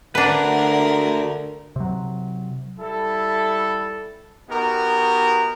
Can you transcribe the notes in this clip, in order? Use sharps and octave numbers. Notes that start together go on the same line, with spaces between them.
D2 D3 D4 A#4 B4 F#5
C3 F#3
G3 E4 A4
B3 D#4 F#4 G4 A#4